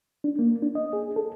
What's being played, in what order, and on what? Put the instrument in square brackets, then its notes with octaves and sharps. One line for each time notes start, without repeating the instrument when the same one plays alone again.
[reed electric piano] D4
A#3
D4
D#5
G#4
A4